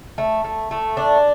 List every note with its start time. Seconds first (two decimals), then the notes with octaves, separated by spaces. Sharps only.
0.18 A3
0.44 A3
0.71 A3
0.97 D4